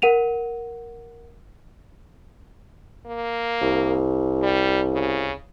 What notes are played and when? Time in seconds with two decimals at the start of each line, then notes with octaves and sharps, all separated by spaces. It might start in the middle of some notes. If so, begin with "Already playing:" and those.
0.02 A#4 F#5 D#7 F7
3.06 A#3
3.62 C2
4.42 G3
4.93 C#3